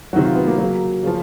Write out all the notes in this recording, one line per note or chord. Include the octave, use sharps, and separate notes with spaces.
C3 D#3 F#3 F#4
F4
B3
A#3
C#3 F#3 A#3
C#3 F3